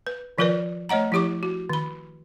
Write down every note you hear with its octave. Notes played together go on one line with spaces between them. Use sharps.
B4
D#3 F3 F4 A#4 B4 D5
A3 C#5 D#5 F#5 A#5
F3 E4 G4 C#6 D6
F#4
D#3 B5